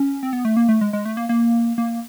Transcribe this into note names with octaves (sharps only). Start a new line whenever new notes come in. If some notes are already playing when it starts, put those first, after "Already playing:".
Already playing: C#4
C4
B3
A3
A#3
A3
G#3
G#3
A3
A#3
A#3
A#3